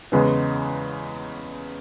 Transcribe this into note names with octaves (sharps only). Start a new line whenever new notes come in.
E2 C#3 G#3 B3